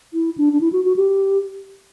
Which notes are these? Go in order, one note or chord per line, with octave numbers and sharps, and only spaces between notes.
E4
D4
D4
E4
F#4
F#4
G4